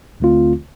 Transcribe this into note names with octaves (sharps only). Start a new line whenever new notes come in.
D2 D3 A3 C4 F4